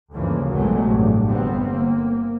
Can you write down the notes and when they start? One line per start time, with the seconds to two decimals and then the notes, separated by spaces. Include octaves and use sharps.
0.13 D2 G2 C#3 E3 F3 A#3
0.52 A#1 E2 C3 F#3 G#3 A3
0.85 A1 G2
1.28 G1 B3 C4
1.71 A#3